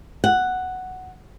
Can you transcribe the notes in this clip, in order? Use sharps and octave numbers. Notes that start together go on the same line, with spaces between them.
F#5